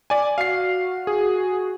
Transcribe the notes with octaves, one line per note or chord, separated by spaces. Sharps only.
D5 G#5
F#4 F5 C7
G#4